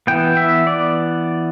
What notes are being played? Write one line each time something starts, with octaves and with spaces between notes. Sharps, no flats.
E3 B3 G5
E5
D5